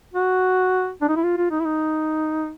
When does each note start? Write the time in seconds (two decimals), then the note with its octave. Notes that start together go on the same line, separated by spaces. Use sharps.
0.14 F#4
1.01 D4
1.09 D#4
1.16 E4
1.24 F4
1.37 F4
1.51 D#4
1.60 E4
1.65 D#4